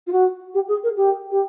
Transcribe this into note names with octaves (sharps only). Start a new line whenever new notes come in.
F4
F#4
G4
G#4
A#4
G4
G4